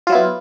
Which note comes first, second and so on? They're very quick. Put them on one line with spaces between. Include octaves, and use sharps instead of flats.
F4 F#3 E4 B3